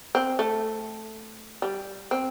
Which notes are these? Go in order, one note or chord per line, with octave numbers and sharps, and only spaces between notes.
C4
A3
G3
C4